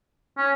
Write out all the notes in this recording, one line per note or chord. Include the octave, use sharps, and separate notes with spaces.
C#4